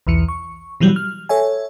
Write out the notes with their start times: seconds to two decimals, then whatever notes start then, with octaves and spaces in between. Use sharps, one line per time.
0.07 B1 E2 E3 C#7
0.28 C#6
0.80 B2 E3 F#3 G3
0.96 F6
1.29 A4 C#5 E5 G#5